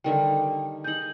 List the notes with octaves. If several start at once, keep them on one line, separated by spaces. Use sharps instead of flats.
D3 D#3 G3 G5
D#4 G#4 G6 F#7